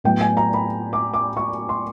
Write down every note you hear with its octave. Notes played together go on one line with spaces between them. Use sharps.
A2 F#3 B3 G5
G#5
A#5
B5
D6
D6
C#6
C6